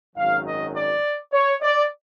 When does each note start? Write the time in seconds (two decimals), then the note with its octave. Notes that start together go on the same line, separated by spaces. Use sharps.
0.16 G#1 F#2 D#3 F#3 F5
0.45 D#5
0.75 D5
1.33 C#5
1.62 D5